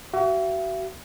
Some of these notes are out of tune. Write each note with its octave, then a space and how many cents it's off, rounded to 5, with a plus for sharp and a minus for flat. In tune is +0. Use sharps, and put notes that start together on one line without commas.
F#4 +35 E5 +40